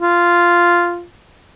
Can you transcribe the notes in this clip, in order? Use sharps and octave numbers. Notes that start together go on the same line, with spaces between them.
F4